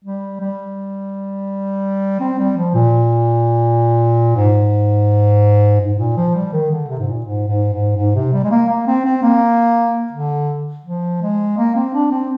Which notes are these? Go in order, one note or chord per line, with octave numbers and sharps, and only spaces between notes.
G3
G3
C4
G3
F3
A#2
G#2
G#2
A#2
F3
G3
D#3
D3
C3
G#2
A#2
G#2
G#2
G#2
G#2
C3
G3
G#3
A#3
A#3
C4
C4
A#3
D3
F3
G#3
A#3
C4
D4
C4